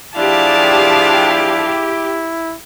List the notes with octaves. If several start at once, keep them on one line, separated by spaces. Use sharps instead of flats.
F3 D4 E4 G4 G#4 F5 A5